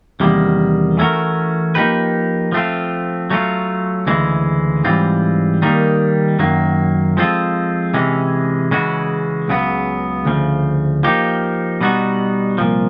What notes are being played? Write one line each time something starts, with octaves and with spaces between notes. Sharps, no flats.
E2 C3 D#3 G3 A#3
E3 A3 C#4 F#4 A#4
F3 A#3 D#4 G4 B4
F3 A3 C4 F4
F#3 A3 C#4 F4
D2 C#3 E3 G#3
G#2 E3 G3 C4 F4
D#3 G3 A#3 D#4
F#2 D#3 F#3 A#3
F3 G#3 C4 F4 A4
C3 E3 G#3 C#4
C#3 E3 G#3 C#4 F#4
C#2 C#3 F#3 B3
D2 C#3 F3
F3 A#3 D#4 G4
B2 G3 B3 D#4 F#4
C2 A#2 F3